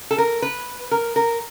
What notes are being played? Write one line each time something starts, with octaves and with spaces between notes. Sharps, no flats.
A4
A#4
B4
A#4
A#4